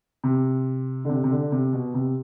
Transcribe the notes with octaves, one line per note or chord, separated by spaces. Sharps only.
C3
D3
C3
C3
D3
C3
B2
C3